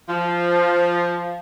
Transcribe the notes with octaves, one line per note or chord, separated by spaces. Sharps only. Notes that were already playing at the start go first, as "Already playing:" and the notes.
F3